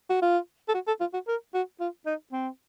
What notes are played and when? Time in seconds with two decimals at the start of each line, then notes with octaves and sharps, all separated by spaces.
0.10 F#4
0.22 F4
0.69 A4
0.74 F#4
0.87 A4
1.00 F4
1.13 F#4
1.28 A#4
1.54 F#4
1.80 F4
2.06 D#4
2.32 C4